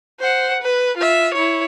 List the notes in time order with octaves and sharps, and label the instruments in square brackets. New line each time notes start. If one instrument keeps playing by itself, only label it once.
[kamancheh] C5 F#5
B4
F4 E5
E4 C#5